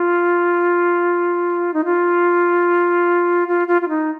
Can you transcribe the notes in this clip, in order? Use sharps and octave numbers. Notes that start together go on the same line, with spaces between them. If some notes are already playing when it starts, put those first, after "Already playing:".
Already playing: F4
D#4
F4
F4
F4
F4
D#4